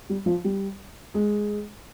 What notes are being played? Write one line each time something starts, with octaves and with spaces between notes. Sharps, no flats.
G3
F3
G3
G#3